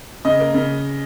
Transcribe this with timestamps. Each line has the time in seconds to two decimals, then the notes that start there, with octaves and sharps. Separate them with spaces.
0.25 C#3 D#5
0.39 A#3
0.54 C#3